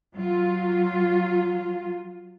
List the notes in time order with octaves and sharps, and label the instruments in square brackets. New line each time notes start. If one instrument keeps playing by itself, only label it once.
[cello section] F#3 F4